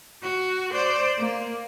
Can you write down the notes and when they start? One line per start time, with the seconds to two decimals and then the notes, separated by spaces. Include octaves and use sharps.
0.23 F#4
0.73 C5 D5
1.18 A#3